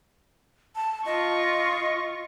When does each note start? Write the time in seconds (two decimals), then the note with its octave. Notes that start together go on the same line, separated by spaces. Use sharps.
0.76 A5
1.06 F4 D#5 C#6